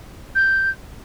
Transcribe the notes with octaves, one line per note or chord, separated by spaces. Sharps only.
G6